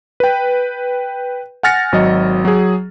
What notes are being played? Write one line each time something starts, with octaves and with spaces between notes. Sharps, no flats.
B4 G5
F#5 G#5 F6 A6 A#6 C#7
G#1 F#3 D#5
F#3 G#4